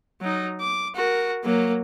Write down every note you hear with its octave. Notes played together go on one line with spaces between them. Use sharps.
F#3 D#4
D6
F#4 A#4
F#3 A#3